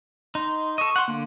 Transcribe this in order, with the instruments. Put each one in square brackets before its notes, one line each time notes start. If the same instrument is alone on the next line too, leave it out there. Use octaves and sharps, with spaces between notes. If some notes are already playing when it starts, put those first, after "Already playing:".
[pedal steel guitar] D#4 [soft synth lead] C6
[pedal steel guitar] A4 D#5 [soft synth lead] C#6
[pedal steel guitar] F#5 C6
[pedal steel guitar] D3 [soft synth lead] A#3